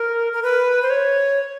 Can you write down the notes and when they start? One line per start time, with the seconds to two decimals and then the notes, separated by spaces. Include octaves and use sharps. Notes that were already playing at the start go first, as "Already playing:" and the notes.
Already playing: A#4
0.33 A#4
0.43 B4
0.82 C5
0.90 C#5